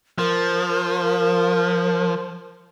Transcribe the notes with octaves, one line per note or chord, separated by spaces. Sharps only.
F3 A#4